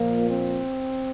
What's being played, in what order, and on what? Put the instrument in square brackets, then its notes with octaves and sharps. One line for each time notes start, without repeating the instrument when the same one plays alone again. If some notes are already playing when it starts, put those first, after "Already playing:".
Already playing: [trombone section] A#2 F3 A#3
C4